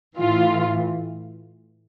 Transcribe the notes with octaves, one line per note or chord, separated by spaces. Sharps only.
A2 E3 F4